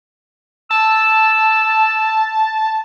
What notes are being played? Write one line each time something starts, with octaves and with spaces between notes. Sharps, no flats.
A5 E6